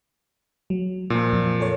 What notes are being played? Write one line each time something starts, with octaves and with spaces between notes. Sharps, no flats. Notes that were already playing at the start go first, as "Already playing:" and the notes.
F#3
A#2 F3
F2
A4 A#4 C#5